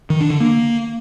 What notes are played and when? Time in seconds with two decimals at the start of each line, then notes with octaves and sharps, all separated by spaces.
0.10 D#3
0.20 D4
0.30 D3
0.40 A#3